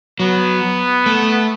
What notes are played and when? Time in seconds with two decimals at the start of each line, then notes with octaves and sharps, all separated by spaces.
0.20 F#3 B3
1.06 A3